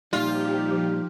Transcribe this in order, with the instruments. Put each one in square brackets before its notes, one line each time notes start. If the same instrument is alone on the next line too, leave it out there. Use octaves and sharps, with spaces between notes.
[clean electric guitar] A#2 G3 [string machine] F3 G4 [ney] D#4 [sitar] F4